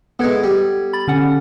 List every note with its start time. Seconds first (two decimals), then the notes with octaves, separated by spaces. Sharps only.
0.19 E3 G#3 B3 A4 G#6
0.43 G3
0.93 B5 A6
1.08 D3 C#4 F#5